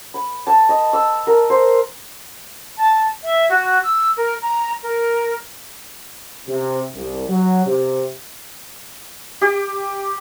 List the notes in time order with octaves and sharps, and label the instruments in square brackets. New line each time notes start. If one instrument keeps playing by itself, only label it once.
[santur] B5
A5
D#5
E6
A#4
C5
[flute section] A5
E5
F#4
E6
A#4
A#5
A#4
[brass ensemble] C3
C2
F#3
C3
[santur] G4